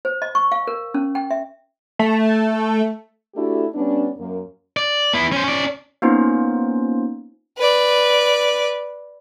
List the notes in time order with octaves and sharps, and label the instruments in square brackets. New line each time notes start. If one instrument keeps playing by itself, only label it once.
[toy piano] C5
D#5
C#6
F5
A#4
C#4
G5
E5
[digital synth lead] A3
[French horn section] A3 D4 E4 F#4 G4 A4
G3 B3 C#4 D4
F#2 A#3
[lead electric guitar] D5
B3 E4
C#4 C5
C#4 D5
[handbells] A#3 B3 C#4 D#4 F4 C5
[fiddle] B4 D5